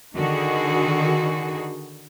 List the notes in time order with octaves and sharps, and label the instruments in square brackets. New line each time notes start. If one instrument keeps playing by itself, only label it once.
[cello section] D3 D#3 D#4 F#4 G#4